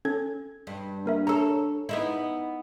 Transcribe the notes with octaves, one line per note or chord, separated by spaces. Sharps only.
C#4 A4 G#6
G2
A#3 A#4 E5
C#4 A4 A#5 E6
B3 D#4 E4